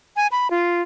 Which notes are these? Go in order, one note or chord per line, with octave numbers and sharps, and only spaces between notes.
G#5
B5
F4